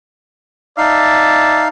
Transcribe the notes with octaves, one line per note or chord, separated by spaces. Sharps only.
D#4 D5 E5 F5 A5